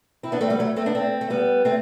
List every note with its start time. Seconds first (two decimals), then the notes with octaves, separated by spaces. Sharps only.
0.23 C4 E4
0.32 B3 D4
0.41 A3 C4
0.50 G3 B3
0.59 F#3 A3
0.76 A3 C4
0.86 B3 D4
0.95 A3 C4
1.21 A3
1.30 G3 B3
1.65 A3 C4